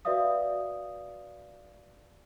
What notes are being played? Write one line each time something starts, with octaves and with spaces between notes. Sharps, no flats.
F#4 B4 D5 E5 F5 D#6